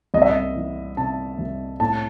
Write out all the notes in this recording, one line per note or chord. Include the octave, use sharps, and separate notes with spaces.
C2 D#5
E5
D#5
E3
C3 A5
C2
A2 A5